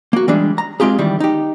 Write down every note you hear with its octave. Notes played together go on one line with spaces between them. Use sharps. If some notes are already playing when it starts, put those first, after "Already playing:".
A#3 F#4
E3 G3 G#3 D4
A#5
G#3 C4 F4 G4 G#4
D#3 E3 G3
D#4 G4